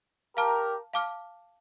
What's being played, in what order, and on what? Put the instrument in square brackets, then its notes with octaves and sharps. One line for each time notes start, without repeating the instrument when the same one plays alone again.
[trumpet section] G4 A#4 [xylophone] F5 A5 D6 F6
[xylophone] F5 A5 D6 F6